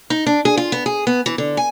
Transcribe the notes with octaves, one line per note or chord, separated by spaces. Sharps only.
D#4
D4
G#4
F4
B3
G#4
B3
E3
D3
G#5